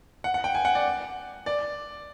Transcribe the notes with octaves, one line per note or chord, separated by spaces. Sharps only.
F#5
F#5
G5
G#5
F#5
D5
D5